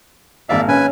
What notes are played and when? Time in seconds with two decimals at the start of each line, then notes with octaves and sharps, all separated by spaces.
0.49 G#1 A#3 D5 E5 F5
0.68 C#4 B4 G#5